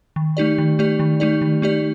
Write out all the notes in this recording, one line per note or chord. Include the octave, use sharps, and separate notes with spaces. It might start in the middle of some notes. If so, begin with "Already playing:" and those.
D#3
A3 D#4 G4 D5
D#3
A3 D#4 G4 D5
D#3
A3 D#4 G4 D5
D#3
A3 D#4 G4 D5